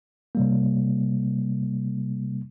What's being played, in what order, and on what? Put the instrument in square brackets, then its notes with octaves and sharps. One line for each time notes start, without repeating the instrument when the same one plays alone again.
[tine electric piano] C3 G3 A#3